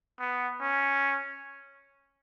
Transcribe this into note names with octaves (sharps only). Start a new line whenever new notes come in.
B3
C#4